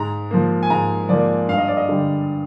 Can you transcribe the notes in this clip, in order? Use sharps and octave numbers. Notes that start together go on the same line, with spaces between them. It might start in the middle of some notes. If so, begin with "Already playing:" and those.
Already playing: G#2 A#5
F3 A#3
G#5
G#2 A#5
F3 A#3 D5
G2 F5
D#5
D5
D#5
D3 G3